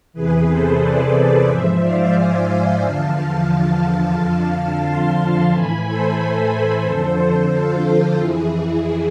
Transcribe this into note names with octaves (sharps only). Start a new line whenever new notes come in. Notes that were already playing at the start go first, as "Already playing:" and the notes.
E2 C3 E3 G#4 B4
A4 C5
B4 D5
G#2 F3 C5 E5
D5 F5
E5 G#5
E2 D3 F3 F5 A5
F2 D3 F3
A5 C6
A2 E3 G#5 B5
A4 C5
F2 D3 F3
F4 A4
F2 E3 E4 G#4